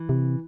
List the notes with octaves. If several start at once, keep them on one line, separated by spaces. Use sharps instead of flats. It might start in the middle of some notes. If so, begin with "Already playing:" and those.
Already playing: E3
C3